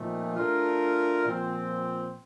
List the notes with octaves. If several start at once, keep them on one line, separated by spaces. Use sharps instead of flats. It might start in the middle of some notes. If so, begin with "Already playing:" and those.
Already playing: A#2 F3 A3 C4 D#4
A3 D4 F4 A#4
A#2 F3 C4